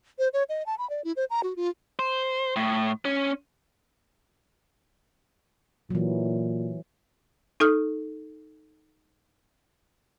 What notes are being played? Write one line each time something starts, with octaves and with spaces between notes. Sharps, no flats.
C5
C#5
D#5
A5
B5
D5
E4
C5
A#5
F#4
F4
C5
A2
C#4
A#2 E3 F#3
D#4 A4 D#6 F6